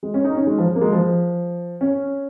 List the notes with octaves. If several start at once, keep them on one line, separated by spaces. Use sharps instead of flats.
G#3
C#4
D#4
C#4
G#3
F3
A#3
G#3
F3
C#4